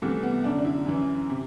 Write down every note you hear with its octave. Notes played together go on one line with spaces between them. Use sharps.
C2 C3 E3 A3
B3
F#2 D3 D4
D4
E4
F#2 E3
C3